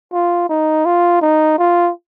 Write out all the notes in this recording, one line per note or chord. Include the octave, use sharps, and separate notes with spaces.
F4
D#4
F4
D#4
F4